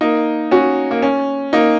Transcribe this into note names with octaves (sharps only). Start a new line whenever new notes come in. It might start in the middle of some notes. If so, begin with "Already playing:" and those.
A#3 D#4
C#4 F#4
A#3
C#4
A#3 D#4